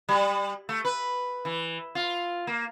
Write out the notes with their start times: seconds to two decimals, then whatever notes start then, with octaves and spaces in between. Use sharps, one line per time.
0.09 G3
0.69 A3
0.85 B4
1.45 E3
1.95 F4
2.47 A#3